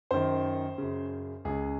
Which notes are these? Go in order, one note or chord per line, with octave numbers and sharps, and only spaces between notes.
F#2 D#3 C5
F#2 C#3
C#2 C#3 G#4